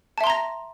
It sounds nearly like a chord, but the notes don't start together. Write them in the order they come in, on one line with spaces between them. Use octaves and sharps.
A5 E5 C6 A#5 A#6